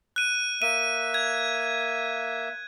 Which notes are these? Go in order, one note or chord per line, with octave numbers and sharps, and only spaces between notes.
F#6 D#7
A#3 E5 D#7
G#6